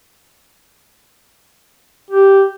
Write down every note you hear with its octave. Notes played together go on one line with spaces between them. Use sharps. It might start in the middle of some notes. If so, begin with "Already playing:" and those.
G4